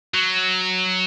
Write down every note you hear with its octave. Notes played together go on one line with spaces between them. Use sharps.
F#3